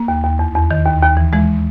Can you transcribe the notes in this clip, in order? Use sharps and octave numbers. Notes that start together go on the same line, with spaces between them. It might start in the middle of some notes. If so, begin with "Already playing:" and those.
Already playing: A#3
D#2
D#2
E2
E2
D#3
D#2
D#2
E3
E3 G#3